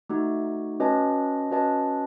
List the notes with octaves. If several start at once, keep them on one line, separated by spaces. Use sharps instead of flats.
A3 D#4 F#4
C#4 F#4 B4 D#5 A5
C#4 F#4 B4 D#5 A5